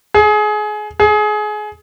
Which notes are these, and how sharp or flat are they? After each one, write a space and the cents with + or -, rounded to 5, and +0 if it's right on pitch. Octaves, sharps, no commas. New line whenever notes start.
G#4 +25
G#4 +25